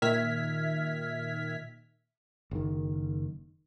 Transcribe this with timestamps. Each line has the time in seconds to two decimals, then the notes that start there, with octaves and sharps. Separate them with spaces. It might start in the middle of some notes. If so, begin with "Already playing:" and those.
0.02 A#2 D#3 E5 F6 G#6 B6
2.51 F#1 D#3